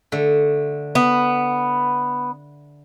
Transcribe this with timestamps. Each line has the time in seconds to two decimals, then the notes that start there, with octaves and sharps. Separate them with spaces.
0.12 D3 A3
0.95 B3